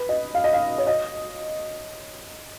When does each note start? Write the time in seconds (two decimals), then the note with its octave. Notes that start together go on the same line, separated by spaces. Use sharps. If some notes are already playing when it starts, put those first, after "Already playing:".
Already playing: B4
0.09 D#5
0.35 F5
0.44 D#5
0.53 F5
0.78 C#5
0.87 D#5